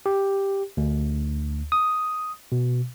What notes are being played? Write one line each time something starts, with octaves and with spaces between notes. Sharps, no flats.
G4
D2
D#6
B2